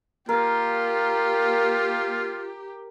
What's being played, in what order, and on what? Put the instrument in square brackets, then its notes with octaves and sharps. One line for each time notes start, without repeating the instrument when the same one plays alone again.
[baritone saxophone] A#3 [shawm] F4 [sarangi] G4 [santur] A#4